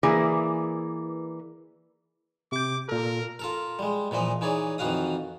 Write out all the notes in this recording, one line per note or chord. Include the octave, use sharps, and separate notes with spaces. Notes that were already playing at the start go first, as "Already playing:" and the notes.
E3 A#3 G#4 D5
C3 D6 G6
A#2 A4 A#4
F4 A4 A#4
G3 G#3
A#2 E3 F3 D#5
E3 D#4 G#4 C#5 D5
F2 D#3 E3 F#4 F5 D#6